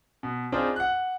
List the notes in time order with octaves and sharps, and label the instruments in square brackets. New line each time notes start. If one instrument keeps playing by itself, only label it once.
[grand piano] B2
C4 D4 D#4 F4 G#4 C5
F#5 F#6